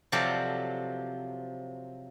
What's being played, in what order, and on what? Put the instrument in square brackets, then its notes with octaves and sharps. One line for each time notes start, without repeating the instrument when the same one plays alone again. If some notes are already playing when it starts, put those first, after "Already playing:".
[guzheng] C3 F3 F#3 A4 D5 F5